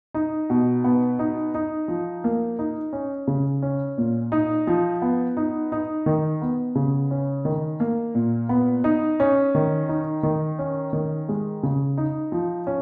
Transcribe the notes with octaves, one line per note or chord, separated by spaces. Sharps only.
D#4
B2
B3
D#4
D#4
F3
A#3
D#4
C#4
C#3
C#4
A#2
D#4
F3
B3
D#4
D#4
D#3
B3
C#3
C#4
D#3
A#3
A#2
B3
D#4
C#4
D#3
D#4
D#3
C#4
D#3
G#3
C#3
D#4
F3
C#4